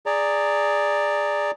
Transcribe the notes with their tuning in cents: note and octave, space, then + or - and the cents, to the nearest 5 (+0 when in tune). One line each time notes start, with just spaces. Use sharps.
G#4 +0 D5 +0 A#5 -20